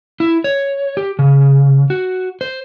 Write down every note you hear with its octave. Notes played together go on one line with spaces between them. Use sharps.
E4
C#5
G4
C#3
F#4
C5